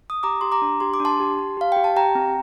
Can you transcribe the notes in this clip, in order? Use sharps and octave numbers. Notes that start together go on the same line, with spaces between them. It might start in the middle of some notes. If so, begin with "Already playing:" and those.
D#6
G4 A#5 D6
G4 C6
A#5 D6
D4
G4 C6
D6
D4
A5 C6
G4
G4
G4 F5
G4 G5
A5
G4 G5 A#5
C4